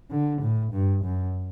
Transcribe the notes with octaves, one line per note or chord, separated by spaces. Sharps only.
D3
A2
G2
F#2